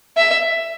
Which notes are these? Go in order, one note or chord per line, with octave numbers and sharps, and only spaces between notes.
E5